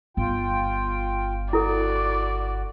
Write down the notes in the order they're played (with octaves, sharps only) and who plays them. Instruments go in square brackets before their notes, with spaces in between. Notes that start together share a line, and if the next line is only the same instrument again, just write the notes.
[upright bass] G1 [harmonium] F4 G5
[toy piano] E4 A4 [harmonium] F#4 [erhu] D5